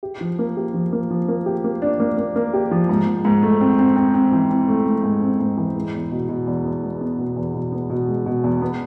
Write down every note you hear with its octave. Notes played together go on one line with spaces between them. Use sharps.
G4
F3
A#3
G4
F3
A#3
F3
A#3
G4
A#3
D4
A#3
A#3
A#3
G4
F3
G#2
G#2
G#2
A3
C4
C4
C4
C4
E3
C4
A3
A3
G#2
C4
G#2
E3
G#3
E2
B2
B2
E2
B3
G#3
B3
B2
E2
B2
B3
B2
G#3
B2
E2
B3